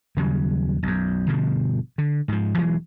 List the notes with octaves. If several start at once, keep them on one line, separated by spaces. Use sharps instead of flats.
D#2 C#3 F#3 G3
B1 F#2
G1 B2 D3 F3
D3
G#2 F3
E1 E3 F#3 G#3